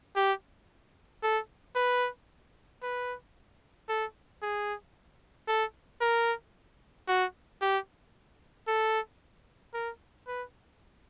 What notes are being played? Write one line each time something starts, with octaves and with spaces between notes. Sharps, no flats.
G4
A4
B4
B4
A4
G#4
A4
A#4
F#4
G4
A4
A#4
B4